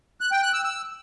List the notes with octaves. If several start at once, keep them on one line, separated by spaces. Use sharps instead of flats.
F#6
G5
F#6
E6
E6